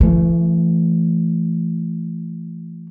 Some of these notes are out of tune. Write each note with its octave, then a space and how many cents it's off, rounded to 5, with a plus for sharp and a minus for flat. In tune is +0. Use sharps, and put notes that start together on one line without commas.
E3 +35 A3 +0